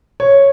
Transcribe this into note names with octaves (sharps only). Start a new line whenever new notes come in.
C#5